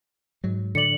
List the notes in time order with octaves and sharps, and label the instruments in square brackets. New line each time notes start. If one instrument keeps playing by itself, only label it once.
[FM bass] G#2 [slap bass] F#3
[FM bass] A2 [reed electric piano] D3 D5 [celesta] C#7 F#7